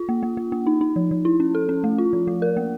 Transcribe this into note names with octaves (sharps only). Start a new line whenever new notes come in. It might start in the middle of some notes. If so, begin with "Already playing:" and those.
Already playing: F4
A#3
A#3
A#3
A#3
D#4
D#4
F3
F3
E4
C#4
A4
C#4
A3
F4
F3
A3
A#4
A#3